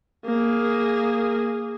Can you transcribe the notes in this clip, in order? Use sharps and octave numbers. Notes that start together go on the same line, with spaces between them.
A#3 G#4